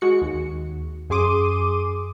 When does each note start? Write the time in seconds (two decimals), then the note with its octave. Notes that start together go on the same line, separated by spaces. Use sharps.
0.01 G#3 F#4 C#7
0.22 D#2
1.10 F#2 G#4 C6 D6 D#6 D#7